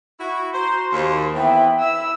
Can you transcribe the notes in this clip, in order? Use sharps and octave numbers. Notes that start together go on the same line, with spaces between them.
E4 F#4
F#4 C5 A#5 C6
D#2 C5
E3 B3 C4 E5 G5
E4 E6